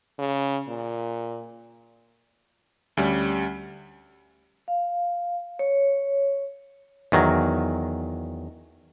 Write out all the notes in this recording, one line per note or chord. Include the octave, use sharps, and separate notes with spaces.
C#3
A#2
D2 G3 C#4
F5
C#5
E2 D#3 F#3